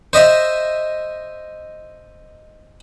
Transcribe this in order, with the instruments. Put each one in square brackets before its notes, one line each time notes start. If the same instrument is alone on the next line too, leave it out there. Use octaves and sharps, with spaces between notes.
[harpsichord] C5 D#5 E5